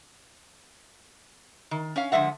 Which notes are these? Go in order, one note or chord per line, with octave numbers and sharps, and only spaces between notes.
D#3
C#4 C#5 F5
D3 F3 G#3 E5 F#5